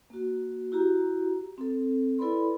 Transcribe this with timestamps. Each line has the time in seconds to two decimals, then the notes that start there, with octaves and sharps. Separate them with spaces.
0.10 A#3 F#4
0.72 E4 F#4 G4 A#5
1.58 C4 A4
2.19 E4 A4 B4 D5 B5 C6